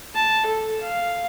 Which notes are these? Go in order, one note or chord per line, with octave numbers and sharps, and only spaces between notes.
A5
A4
F5